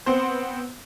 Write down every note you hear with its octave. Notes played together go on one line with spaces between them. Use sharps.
B3 C4 C5